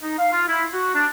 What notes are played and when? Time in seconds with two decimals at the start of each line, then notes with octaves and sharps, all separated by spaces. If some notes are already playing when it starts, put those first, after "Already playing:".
0.03 D#4
0.19 F5
0.32 F4
0.48 E4
0.73 F#4
0.95 D4